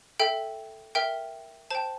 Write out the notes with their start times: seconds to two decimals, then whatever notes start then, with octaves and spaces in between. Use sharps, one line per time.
0.20 A4 E5 G5
0.95 A#4 E5 G5
1.71 C5 G5 A5